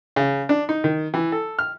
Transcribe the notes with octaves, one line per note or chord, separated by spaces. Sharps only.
C#3
D4
D#4
D#3
E3
A4
F6